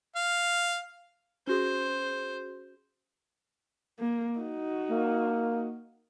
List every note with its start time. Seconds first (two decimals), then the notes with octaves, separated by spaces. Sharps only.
0.16 F5
1.47 C#4 F#4 G#4 C5
3.99 A#3
4.39 D#4 F#4
4.90 A#3